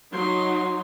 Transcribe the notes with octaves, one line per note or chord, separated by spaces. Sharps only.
F#3 D#4 C6